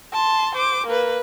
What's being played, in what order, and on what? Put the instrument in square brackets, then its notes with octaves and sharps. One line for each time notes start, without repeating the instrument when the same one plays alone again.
[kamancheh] A5 C6
C5 D6
A#3 B4